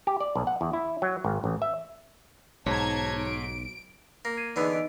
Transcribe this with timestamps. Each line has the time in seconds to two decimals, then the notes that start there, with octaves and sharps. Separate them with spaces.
0.07 G4
0.21 D5
0.36 B1
0.47 F#5
0.61 E2
0.73 E4
1.02 F#3
1.25 G#1
1.44 A1
1.62 E5
2.66 B1 G#2 C#5 A5 A#5 G#6
3.18 D7
4.25 A#3 A#6
4.37 G#6 C7 D#7
4.56 D3 E3 B3 D#4 G#4 D#5
4.72 D#4 D#5 D7